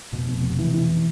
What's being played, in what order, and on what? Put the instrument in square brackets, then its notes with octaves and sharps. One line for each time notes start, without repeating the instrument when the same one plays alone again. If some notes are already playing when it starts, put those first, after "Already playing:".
[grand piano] F1 [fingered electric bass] B2
[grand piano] F1
F1
E3
E3